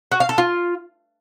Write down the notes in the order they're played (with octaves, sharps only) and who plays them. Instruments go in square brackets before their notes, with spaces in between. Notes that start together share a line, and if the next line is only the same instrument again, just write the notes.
[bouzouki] F#4
F5
A4
F4